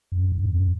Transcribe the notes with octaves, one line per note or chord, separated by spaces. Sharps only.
F#2
G2
E2
F#2